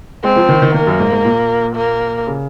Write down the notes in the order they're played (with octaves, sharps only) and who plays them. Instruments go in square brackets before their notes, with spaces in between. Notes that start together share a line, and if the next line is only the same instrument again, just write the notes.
[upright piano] G#3 [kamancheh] C4
[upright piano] F3
D#3
D#3
[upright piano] D#3 [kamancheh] A#3
[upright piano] F#2
G#2
G#2
A#2
[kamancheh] A#3
[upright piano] C#3